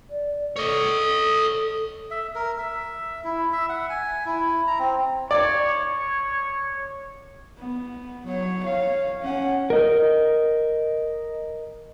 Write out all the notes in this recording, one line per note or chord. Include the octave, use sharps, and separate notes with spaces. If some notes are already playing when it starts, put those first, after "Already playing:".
D5
A4 C#5 D#5
E5
A#4
E5
E4
E5
F#5
G#5
E4
A#5
C4
C#5 D5
B3
F#3 C#5
C#5 F5
C#4 F#5
A#4 D#5